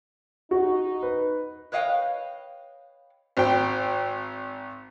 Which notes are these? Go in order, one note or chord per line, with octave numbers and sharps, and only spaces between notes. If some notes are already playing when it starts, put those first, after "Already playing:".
D#4 F#4
B4
B4 C#5 D#5 F5 G5
G#1 G5